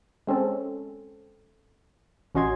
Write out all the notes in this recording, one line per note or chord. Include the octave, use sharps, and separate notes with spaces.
G#3 C4 C#4 A4
A1 C#4 F#4 D#5 C6 G#6